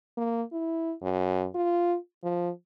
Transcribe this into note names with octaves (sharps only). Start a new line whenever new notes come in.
A#3
E4
F#2
F4
F3